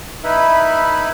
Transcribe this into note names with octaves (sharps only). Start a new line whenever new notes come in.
D#4 E4 B4 E5